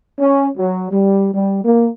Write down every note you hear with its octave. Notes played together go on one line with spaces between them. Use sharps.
C#4
F#3
G3
G3
A#3